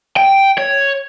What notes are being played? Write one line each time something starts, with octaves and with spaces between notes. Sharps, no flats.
G5
C#5